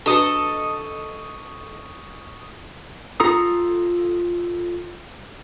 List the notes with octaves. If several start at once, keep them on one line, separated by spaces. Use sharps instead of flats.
D4 F#4 A4 B4 D#5 C#6 D#6 D#7
F4 A4 A#5 D#6